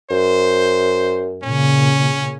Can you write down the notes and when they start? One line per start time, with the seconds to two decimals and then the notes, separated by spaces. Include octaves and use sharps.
0.11 F#2 C5
1.43 A#2 C#3 C#4